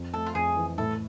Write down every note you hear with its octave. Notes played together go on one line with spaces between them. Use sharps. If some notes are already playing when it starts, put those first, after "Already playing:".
Already playing: F2
A3 A4
F4
F2 G#4
E3
A2 A4